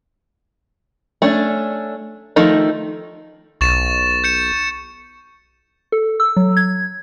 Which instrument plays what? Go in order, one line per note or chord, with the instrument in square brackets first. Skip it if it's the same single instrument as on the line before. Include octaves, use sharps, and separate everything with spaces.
[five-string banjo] A3 C#4 D4
D#3 F3 A3 D#4
[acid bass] B1 [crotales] C#6 A6 E7
[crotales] G6 C#7 E7
[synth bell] A4
E6
F#3
G#6